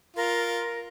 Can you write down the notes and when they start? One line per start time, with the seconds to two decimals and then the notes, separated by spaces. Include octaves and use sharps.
0.16 F4 A#4